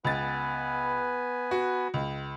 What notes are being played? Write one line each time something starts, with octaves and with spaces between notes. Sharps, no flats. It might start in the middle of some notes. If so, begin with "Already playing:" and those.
C#2 B3 B4 G#5 A6
F#4
C#2